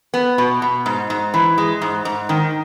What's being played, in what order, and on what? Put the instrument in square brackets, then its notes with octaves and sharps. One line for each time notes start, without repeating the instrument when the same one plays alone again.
[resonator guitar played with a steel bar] B3
B2
B2
G#2
G#2
E3
G#3
G#2
G#2
D#3